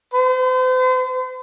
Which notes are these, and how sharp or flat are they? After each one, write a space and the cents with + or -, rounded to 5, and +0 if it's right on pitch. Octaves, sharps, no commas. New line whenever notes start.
C5 -40